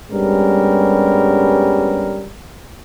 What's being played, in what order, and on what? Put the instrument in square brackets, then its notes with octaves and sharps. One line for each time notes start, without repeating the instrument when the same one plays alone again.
[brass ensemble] G2 G3 G#3 B3 C#4 A#4